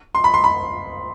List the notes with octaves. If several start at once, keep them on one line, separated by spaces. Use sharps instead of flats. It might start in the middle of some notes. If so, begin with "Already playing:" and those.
C6
B5
C6
B5